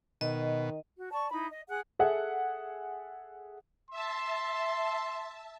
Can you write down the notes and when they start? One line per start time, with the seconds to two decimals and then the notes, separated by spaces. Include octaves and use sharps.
0.21 B2 D#3 D#5
0.97 F#4
1.12 D5 A5 C#6
1.31 D#4 E4 B5
1.52 D#5
1.69 G#4 F#5 F#6
1.99 G#4 A4 E5 F#5
3.90 E5 A5 C6